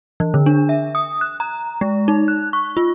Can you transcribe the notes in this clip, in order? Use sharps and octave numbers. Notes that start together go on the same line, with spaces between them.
E3
D3
D4
E5
D#6
F#6
A#5
G#3
D#4
F#6
C#6
F4